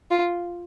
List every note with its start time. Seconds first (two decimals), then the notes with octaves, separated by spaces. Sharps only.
0.11 F4